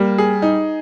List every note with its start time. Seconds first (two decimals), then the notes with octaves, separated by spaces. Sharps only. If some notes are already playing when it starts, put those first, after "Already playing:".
Already playing: G3 A#3
0.18 G#4
0.42 D#4